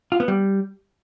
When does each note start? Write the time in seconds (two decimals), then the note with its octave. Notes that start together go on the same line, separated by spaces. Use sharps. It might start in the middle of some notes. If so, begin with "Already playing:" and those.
0.12 F4
0.20 B3
0.28 G3